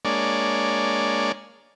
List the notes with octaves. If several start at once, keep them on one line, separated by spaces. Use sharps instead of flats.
G#3 A#3 D4 C#5 D5